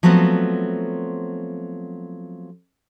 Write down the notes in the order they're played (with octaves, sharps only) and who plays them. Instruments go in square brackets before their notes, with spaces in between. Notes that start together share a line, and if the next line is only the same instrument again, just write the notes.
[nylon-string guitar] F3 F#3 A3 B3 C4